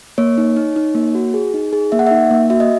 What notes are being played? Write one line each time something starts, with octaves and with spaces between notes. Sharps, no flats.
A#3 C#5
D#4
D#4
D#4
A#3
F#4
G#4
D#4
G#4
A#3 E5
F#5
D#4 E5
A#3
F#4 E5
D#5